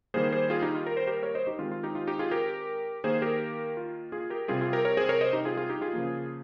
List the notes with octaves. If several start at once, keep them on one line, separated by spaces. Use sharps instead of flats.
D#3 G3 A#3 G#4 C5
G#4 C5
F4 G#4
D#4 G4
F4
A#4
C5
G4 A#4
A#4 C#5
C5 D#5
D#4 G4
D#3 G#3 C4 F4
F4
D#4 G4
F4
D#4 G4
F4 G#4
G4 A#4
D#3 A#3 G#4 C5
G4 A#4
F4
F4 G#4
G4 A#4
C3 G3 C4 F4 G#4
F4 G#4
G4 A#4
A#4 C#5
G#4 C5
A#4 C#5
C5 D#5
D#4 G4
F4 G#4
F4 G#4
D#4 G4
F4 G#4
C#3 F3 A#3